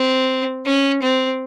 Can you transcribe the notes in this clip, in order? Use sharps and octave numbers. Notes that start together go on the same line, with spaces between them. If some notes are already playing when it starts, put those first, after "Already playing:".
Already playing: C4
C#4
C4